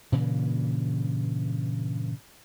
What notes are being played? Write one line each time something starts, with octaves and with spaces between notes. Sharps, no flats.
G2 A#2 C#3 E3